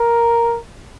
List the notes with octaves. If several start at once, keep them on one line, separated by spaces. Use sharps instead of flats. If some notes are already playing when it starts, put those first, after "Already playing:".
Already playing: A#4